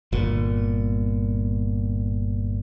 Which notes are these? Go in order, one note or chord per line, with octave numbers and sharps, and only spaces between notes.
G1 A#2